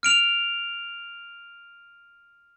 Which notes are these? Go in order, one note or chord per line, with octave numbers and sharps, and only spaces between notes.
F6 D7 F7